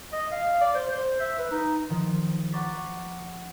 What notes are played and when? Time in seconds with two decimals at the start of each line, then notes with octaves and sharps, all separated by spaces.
0.13 D#5
0.32 F5
0.61 D5
0.75 C5
0.92 C5
1.20 E5
1.39 B4
1.52 D#4
1.89 D#3 F3
2.52 F#5 A#5 C#6 D6 A6 B6